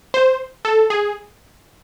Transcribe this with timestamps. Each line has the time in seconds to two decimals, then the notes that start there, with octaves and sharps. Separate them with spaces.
0.14 C5
0.65 A4
0.90 G#4